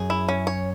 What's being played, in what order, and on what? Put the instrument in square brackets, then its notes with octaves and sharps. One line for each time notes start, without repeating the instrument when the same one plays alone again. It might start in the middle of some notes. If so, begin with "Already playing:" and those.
Already playing: [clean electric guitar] F#2 [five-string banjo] G#4
[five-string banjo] E4
C#4
C#5